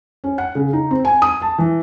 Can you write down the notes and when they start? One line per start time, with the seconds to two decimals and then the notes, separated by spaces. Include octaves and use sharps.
0.24 C#4
0.38 F#5
0.55 C#3
0.73 D#4
0.91 C4
1.05 G#5
1.22 D#6
1.42 A5
1.58 E3